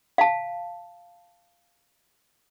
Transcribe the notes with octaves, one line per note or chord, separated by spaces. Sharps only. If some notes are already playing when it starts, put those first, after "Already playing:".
F5 A5